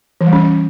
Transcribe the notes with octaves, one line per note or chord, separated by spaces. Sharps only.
E3
G3
C#4